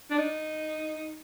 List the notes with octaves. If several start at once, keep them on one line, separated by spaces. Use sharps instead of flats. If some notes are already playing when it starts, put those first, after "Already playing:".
D4
D#4